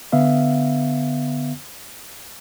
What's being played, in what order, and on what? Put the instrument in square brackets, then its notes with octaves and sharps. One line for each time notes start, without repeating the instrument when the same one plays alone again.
[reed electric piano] D3 B3 E5 F5